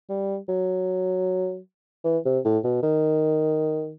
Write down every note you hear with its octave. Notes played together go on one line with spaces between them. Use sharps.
G3
F#3
E3
C3
A2
B2
D#3